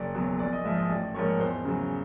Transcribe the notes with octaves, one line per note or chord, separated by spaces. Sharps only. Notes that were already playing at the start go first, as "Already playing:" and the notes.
Already playing: F#1 D5
E2 B2 F#3
A#1 D5
D#5
G#2 F3 E5
D#5
A1 D5
G#2 F3 A#3 C#5
E2 C5
C#3 F#3